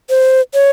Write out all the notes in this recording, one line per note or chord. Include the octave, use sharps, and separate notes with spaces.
C5
C#5